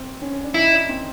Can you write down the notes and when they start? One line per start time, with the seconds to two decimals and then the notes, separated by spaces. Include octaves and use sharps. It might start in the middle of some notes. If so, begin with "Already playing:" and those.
Already playing: C4
0.22 C#4
0.44 D4
0.54 D#4 E4
0.72 D4
0.89 C4